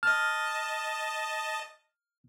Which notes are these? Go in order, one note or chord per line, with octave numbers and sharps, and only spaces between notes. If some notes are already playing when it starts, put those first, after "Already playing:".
D#5 A5 F6